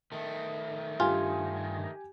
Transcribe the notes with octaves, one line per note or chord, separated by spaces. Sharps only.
D#3 A3
G2 F4 G4 G#5